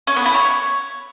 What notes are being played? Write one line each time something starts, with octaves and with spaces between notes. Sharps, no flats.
C#4
B3
E4
C#5